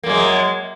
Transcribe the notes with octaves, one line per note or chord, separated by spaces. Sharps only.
F#2 G#3 A#3